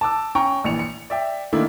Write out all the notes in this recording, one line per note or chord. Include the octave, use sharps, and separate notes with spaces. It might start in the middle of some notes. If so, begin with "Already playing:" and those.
A5 D6 E6
C#4 G5 A#5 C#6
A#1 E3 C#7 F7
C#7
D5 E5 G5
D#3 A3 A#3 D4 E4